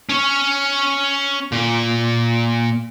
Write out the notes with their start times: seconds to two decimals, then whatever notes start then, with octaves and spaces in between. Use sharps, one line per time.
0.09 C#4 C#5
1.52 A#2